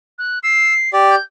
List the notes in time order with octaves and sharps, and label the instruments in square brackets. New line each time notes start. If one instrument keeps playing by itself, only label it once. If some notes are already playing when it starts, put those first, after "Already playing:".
[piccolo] F#6
[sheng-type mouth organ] E6 [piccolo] C7
[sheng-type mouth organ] G4 D5
[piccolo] G6